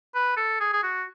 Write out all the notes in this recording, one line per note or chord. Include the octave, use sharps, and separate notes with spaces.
B4
A4
G#4
G#4
F#4